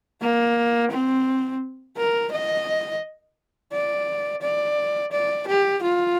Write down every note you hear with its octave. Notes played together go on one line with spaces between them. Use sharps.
A#3
C4
A#4
D#5
D5
D5
D5
G4
F4